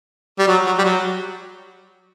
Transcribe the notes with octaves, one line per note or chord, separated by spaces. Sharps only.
G3
F#3
F#3
G3
F#3